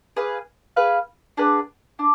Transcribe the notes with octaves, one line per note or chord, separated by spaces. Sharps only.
G#4 B4 F5
G#4 B4 F5
D4 G#4 B4 F#5
D4